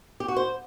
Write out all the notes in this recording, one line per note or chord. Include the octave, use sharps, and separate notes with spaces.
G4
F#4
C5